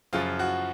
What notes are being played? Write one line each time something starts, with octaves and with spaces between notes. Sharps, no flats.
F#2 C#3 F3 F4
F#4